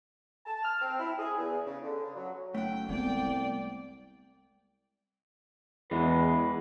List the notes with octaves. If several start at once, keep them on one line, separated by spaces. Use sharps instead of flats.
A5
F6
C4
E4
G#4
E2
C#3
D3
C#3
F#3
F#1 A3 F#5 G5
C2 G#3 B3 D5 G5
E2 E3 G#3 B4